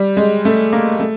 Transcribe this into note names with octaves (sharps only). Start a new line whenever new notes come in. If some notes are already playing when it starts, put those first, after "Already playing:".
Already playing: G3
G#3
A3
A#3
A3